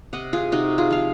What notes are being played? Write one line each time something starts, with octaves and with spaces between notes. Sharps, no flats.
C3 D#5 F#5
F4 G#4
C3 D#4 F#4
F4 G#4
F3 F5